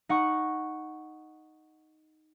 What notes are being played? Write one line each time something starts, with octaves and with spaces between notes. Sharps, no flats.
D#4 F#5 C#6